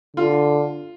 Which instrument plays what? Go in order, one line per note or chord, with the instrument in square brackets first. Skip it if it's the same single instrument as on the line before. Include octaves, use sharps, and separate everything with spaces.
[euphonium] D3 [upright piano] F4